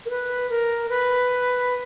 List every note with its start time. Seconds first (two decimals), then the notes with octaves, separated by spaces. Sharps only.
0.05 A#4
0.10 B4
0.49 A#4
0.89 B4